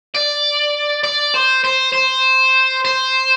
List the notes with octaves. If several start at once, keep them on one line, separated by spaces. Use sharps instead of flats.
D5
D5
C5
C5
C5
C5